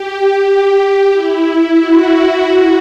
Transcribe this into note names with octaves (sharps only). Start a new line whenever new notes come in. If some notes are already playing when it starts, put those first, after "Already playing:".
Already playing: G4
E4
E4
F#4
F#4